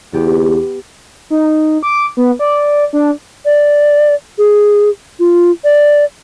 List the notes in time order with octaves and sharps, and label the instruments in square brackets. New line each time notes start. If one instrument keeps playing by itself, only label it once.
[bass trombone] E2 [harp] B3 G4
[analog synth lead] D#4
D6
B3
D5
D4
[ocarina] D5
G#4
F4
D5